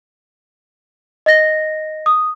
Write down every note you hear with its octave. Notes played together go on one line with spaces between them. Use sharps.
D#5 A6 A#6
D#6